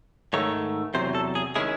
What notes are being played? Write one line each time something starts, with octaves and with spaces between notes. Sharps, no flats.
G#2 D#3 A3 C#5
E2 C3 F#3 C5
A4
G#4
D#3 G#3 C#4 E4 G#4